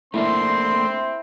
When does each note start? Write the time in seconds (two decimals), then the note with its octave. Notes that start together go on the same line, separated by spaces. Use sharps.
0.14 A3 A#3 C4 D4 E4 C6